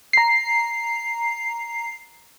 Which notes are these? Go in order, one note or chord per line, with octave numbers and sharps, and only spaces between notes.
A#5 C7